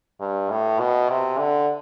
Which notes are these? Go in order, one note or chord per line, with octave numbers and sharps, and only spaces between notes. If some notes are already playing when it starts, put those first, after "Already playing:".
G2
A2
B2
C3
D3